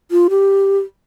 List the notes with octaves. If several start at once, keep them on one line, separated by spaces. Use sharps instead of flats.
F4
G4